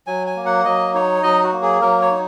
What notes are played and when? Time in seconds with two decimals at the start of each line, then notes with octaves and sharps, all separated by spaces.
0.07 F#3 G#5
0.27 G#5
0.36 A#3
0.46 F#5
0.65 F#3 D#5
0.94 D#4 C#5
1.23 F#3 D#5
1.44 F#4
1.52 A#3
1.62 G#4
1.82 F#3 A#4
2.02 C#5
2.11 D#4